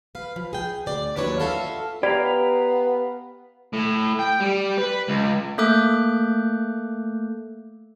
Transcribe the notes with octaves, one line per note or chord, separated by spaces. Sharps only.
B4 F5
F3
G#4 G5
D2 D5
D#2 F#3 D4 E4 B4 C#5
F4 F#4 A4 E5 F5
B3 G4 B4 D5 F5 A#5
A2
G5
G3
B4
C#2
A3 A#3 A4 D6 F#6 G6